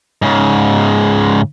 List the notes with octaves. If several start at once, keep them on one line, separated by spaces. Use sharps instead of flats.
G#2 C#3